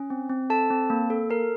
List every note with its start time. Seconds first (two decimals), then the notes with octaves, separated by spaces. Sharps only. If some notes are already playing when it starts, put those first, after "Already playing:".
Already playing: C#4
0.10 C4
0.29 C4
0.50 A4 A5
0.70 C4
0.90 A#3
1.10 A4
1.30 A4 A#4